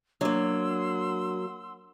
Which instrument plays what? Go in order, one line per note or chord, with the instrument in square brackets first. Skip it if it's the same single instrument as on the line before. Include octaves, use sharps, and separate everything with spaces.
[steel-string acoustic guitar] F#3 A#3 [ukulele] D4 [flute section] F#5 C6 E6